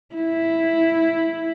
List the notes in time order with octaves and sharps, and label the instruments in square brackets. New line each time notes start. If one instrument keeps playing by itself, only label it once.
[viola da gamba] E4